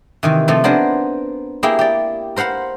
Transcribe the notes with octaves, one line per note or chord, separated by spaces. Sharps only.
C3 D#3 E3
C3 F3 A3 F4
B3 D4 A#4 C5 G#5
A#3 E4 G4 G#4
G4 D5
A#4 C5 F5 F#5 B5